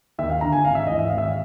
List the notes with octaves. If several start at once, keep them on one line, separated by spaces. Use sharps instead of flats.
D#2 E5
F5
D3 A#5
G#5
G#1 F5
E5
G#2 E3 D#5
E5
G#1 F5
E5
F5